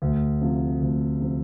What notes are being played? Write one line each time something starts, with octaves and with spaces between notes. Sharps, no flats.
D2
C3 F3 C4
D2
C3 F3 C4